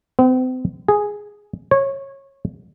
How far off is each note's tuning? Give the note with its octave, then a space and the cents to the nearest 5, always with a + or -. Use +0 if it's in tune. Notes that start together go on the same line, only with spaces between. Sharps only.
C4 -40
G#4 +0
C#5 -20